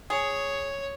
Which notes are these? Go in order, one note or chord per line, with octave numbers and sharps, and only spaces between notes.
G#4 C#5